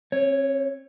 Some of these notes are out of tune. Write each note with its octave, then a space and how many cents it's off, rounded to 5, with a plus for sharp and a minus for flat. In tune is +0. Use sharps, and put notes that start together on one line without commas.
C4 +40 C#5 +0